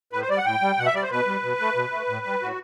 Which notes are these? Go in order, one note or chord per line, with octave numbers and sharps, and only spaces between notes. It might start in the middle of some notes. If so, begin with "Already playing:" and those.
A2 B4
C5
G3 D5
F#5
A2 G5
G3
B2 F#5
E5
G3 D5
C5
B2 B4
G3
B2
A3
B2
A3
A2
G3
A2 F#4